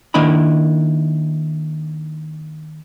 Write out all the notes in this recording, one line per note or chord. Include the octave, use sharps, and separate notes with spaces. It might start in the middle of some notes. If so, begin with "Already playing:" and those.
D#3 A#3 D4 E4 D#5 B5